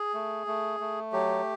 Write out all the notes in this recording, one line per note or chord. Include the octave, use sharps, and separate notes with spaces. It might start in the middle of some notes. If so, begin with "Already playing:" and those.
Already playing: G#4
A3
A3
A3
F#3 G4